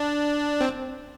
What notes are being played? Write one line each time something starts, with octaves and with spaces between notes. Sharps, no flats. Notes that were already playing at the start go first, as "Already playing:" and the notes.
Already playing: D4
C4